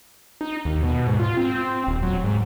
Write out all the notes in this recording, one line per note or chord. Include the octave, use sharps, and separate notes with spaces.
D#4
D#2
B2
G#2
F4
C4
D#1
F#3
G#2